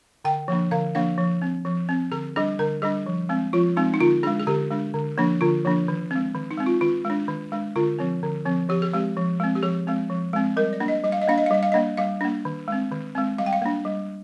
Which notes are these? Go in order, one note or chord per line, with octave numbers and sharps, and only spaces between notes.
D3 G5
F3 A#3 D4
D3 F5
F3 A#3 D4 F5
F3
C4
F3
C4
D3 G#4
G3 D4 G#4
D3 A#4
G3 D4 G#4
F3
G#3 C4
F3 F4
G#3 C4 D#4
D#4
D3 F4
G#3 D4 G#4
G#4
D3 G4
G#3 D4
D3
F3 A#3 D4
D3 F4
F3 A#3 D4
D#3
G#3 C4
D#3
D#4
G#3 C4
F4
D#3 F4
G#3
D4
D#3
G#3 D4
D3 F4
F3 C4
D3
F3 C4
F3 G4
G#4
G#3 C4 G4
F3
G#3 C4
G4
F3 G#4
G#3 C4
F3
G#3 C4
G3 A#4
D5
A#3 D4
D#5
G3 D#5
F5
D#5
A#3 D4 F5
D#5
F5
G3 D#5
F5
A#3 D4 D#5
G3 F5
A#3 D4
D#3
G#3 C4
D#3
G#3 C4
G3 F5
G5
F5
A#3 D4
G3